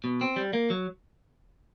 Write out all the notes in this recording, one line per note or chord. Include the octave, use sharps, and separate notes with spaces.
B2
C4
G3
A#3
F#3